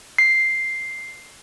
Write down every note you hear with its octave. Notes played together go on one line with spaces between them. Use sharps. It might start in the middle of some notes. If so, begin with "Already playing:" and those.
C7